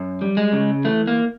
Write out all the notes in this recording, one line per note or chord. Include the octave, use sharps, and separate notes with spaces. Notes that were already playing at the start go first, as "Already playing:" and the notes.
Already playing: F#2
G3
G#3
C#3
E3 A3
A#3